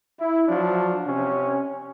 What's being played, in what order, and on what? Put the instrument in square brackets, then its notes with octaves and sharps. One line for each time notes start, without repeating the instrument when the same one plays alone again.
[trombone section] E4
F3 F#3 D4
C3 C#4